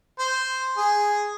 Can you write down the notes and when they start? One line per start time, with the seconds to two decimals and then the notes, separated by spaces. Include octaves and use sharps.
0.19 C5
0.77 G#4